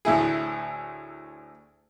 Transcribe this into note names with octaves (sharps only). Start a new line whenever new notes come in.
D2 A2 E4 G#4